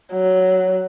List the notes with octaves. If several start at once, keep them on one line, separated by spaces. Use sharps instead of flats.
F#3